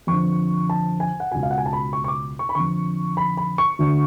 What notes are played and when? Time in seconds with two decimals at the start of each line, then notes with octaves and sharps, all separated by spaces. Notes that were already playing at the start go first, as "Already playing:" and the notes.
0.07 F2 D3 C#6
0.70 A5
1.00 G#5
1.20 F#5
1.31 C#2 B2 G#5
1.43 F5
1.51 F#5
1.58 G#5
1.66 A5
1.73 B5
1.93 C#6
2.04 C#6
2.08 D6
2.39 C#6
2.49 B5
2.55 F2 D3 C#6
3.17 B5
3.37 B5
3.58 C#6
3.79 D2 D3